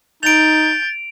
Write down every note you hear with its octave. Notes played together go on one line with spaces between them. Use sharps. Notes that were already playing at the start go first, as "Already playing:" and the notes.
D#4 G6 A6 D7 F7